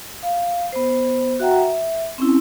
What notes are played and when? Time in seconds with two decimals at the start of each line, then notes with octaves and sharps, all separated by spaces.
0.23 F5
0.72 B3 C5
1.40 F#4 E5 F#5 G5 A#5
1.54 E5
2.18 C4 C#4 E4